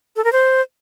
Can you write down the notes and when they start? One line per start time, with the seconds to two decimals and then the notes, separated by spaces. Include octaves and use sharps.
0.16 A4
0.24 A#4
0.32 C5